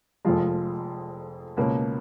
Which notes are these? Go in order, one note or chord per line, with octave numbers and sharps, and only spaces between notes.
F1 F2 F3 G#3 F4
C#2 B2 A#3 C#4